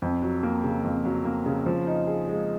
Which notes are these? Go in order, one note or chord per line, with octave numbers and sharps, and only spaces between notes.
F2
F#3
A#3
C#3
F2
F#3
A#3
C#3
F3
D#4
G#4
G#3